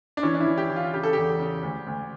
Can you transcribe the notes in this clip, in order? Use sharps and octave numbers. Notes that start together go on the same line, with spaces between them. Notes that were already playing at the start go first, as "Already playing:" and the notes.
D4
E3 C#4
D4
E4
E3
G4
E3
F4
C#3 G4
A4
E2 G4
C#3
D2
D2